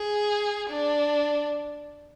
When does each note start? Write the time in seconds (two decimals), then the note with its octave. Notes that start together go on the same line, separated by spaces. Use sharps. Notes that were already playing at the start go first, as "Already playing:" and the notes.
Already playing: G#4
0.70 D4